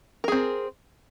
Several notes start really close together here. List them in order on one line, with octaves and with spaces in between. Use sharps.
A#4 G#4 C4